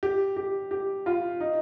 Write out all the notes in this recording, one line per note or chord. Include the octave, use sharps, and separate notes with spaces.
G4
G4
G4
F4
D#4